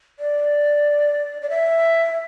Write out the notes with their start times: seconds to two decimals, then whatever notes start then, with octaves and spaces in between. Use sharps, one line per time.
0.19 D5
1.42 D5
1.50 E5